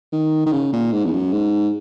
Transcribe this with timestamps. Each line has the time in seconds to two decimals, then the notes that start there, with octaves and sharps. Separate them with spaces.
0.12 D#3
0.46 D#3
0.52 C#3
0.72 A#2
0.92 G#2
1.05 E2
1.12 F#2
1.32 G#2